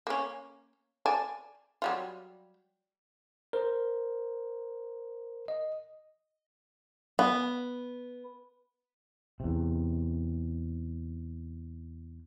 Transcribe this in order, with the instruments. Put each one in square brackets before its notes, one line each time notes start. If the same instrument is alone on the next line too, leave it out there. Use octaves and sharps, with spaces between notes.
[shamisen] A#3 C#4
D5 G#5 A5
F#3 G3 F4
[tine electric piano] A#4 C5
D#5
[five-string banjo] B3
[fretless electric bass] E2 C3